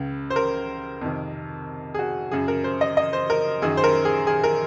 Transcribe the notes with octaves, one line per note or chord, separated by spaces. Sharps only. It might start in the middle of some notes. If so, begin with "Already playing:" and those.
Already playing: C#2 C#3
C5
A#4
F2 C3 D#3
G#4
F#4
F#2 C#3 G#4
A#4
C5
D#5
D#5
C5
A#4
F#2 D#3 G#4
C5
A#4
G#4
G#4
A#4